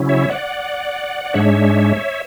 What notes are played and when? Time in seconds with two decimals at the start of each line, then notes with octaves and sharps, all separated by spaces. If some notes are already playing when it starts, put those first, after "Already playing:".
Already playing: C#3 F#3 C#4 E4
0.09 C#5 E5
0.30 D5 F#5
1.25 D5
1.34 G#2 G#3 D4 C#5 E5